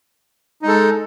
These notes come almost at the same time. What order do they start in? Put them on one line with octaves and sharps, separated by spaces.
D#4 G#3 A4